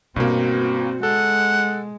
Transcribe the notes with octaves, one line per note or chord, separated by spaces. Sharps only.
G2 B2 A#3 C4 F#4
G#3 A4 F#5